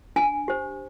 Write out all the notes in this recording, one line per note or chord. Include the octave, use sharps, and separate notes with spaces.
D4 G#5
G4 C5